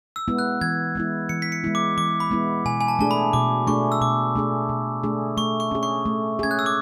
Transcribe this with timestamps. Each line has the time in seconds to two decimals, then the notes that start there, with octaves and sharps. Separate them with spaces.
0.16 E6
0.28 G#3 B3 E4
0.39 F#6
0.61 E3 G#6
0.95 G#3 B3 E4
1.29 E3 C#7
1.42 B6
1.52 C#7
1.64 G#3 B3 E4
1.75 D6
1.97 E3 D6
2.20 B5
2.31 G#3 B3 E4
2.65 B2 G#5
2.80 G#5
2.88 A5
2.99 A3 D4 G#4 A5
3.11 B5
3.33 B2 D6
3.67 A3 D4 G#4 C#6
3.92 E6
4.01 B2 D6
4.36 A3 D4 G#4
4.69 B2
5.03 A3 D4 G#4
5.37 A3 C#6
5.60 C#6
5.71 C#4 G#4
5.83 C#6
6.05 A3
6.39 C#4 G#4 G#6
6.51 F#6
6.59 E6
6.66 D6